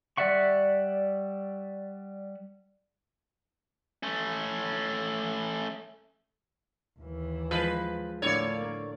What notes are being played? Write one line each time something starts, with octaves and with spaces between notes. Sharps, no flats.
G3 D5 E5 F#5 C#6
A3 C#4
D#2 E3
F3 G#3 B4
A2 D3 A3 A#3 C#5 D5